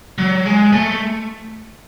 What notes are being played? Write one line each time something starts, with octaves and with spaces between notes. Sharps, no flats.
F#3
G#3
A3